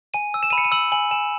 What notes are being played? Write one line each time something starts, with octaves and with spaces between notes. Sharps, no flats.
G#5 D#7
E6
E7
B5 D#7
C#7
D#7
E6 F#7
G#5 F#7
G#5 E7